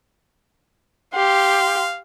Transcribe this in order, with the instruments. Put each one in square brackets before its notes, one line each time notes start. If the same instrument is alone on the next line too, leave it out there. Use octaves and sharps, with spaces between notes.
[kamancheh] G4 C6 [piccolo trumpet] F5